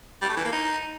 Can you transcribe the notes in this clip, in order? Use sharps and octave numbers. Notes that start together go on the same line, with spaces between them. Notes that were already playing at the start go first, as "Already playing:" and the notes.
G3
A3
E3
A#3
D#4